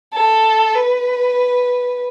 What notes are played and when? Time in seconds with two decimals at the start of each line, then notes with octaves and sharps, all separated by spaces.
0.14 A4
0.75 B4